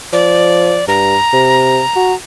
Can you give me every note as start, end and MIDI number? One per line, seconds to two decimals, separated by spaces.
0.13 0.80 53
0.13 0.85 74
0.88 1.16 43
0.88 2.15 82
1.33 1.82 48
1.96 2.14 66